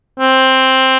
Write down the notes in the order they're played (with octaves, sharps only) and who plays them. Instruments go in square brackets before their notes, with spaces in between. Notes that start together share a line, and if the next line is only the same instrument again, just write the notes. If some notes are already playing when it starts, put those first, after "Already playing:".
[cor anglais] C4